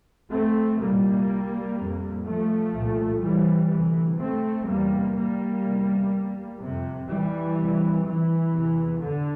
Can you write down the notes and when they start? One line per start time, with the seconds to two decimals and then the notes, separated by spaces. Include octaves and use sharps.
0.32 A3 C4
0.80 C2 A#2 G3 A#3
1.77 F2 C3
2.25 F3 A3
2.74 C2 A#2
3.22 E3 G3
3.71 D2 C3 E3
4.20 A3 C4
4.68 E2 C3 G3 A#3
5.16 G3 A#3
5.64 E2 C3
6.61 F2 C3
7.10 E3 G3
7.58 E2 C3
8.07 E3
8.55 E2 C3
9.03 D3